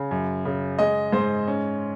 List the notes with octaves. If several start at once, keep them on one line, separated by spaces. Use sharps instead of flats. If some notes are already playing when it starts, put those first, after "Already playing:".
Already playing: C#3
F#2
C#3
G#3 D#5
G#2 C5
C#4